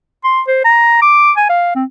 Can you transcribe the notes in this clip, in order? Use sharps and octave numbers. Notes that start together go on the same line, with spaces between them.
C6
C5
A#5
D6
G#5
F5
C4